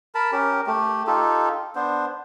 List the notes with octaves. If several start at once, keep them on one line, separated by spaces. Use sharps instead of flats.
A#4 A5 B5
C#4 G4 A#4
A3 G4
D#4 F4 G4 A4
B3 D4 C5